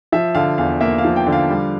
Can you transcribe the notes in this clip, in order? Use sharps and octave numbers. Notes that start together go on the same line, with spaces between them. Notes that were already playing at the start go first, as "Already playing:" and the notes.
F3 E5
D3 F5
E2 F5
A#3 E5
F5
F3
G5
D3
F5
G3